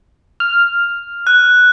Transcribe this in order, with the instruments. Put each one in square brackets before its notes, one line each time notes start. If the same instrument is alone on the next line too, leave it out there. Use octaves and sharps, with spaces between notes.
[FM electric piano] F6
[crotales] F#6